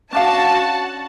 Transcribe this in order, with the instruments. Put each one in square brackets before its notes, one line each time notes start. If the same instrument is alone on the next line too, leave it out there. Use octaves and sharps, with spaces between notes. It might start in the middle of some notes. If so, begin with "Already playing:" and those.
[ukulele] C#4 D4 F5 [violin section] F#4 A5